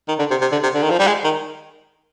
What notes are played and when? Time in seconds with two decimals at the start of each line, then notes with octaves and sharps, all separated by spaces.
0.08 D#3
0.19 D3
0.31 C3
0.41 C3
0.52 D3
0.63 C3
0.75 D3
0.83 D#3
0.90 F3
0.99 G3
1.07 G#3
1.24 D#3